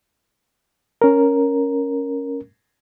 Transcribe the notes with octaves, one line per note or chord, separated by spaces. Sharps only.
C#4 A#4